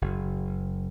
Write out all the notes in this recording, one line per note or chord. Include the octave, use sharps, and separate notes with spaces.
F#1